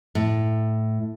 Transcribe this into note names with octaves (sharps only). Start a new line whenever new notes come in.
A2